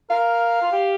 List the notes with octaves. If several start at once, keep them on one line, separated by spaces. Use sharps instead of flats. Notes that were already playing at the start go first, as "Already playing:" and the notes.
A#4 F5
F4
G4